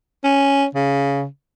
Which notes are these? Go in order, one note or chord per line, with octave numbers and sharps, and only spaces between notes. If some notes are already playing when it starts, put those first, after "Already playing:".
C#4
C#3